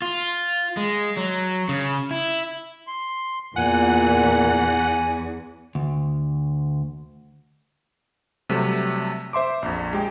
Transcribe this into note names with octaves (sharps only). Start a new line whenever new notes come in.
F4
G#3
F#3
C#3
E4
C6
E2 A#2 F#5 G#5
D2
C3 F#3 G3 A3
C5 E5 C6 D6
A#1 F2
G#3 G4 G5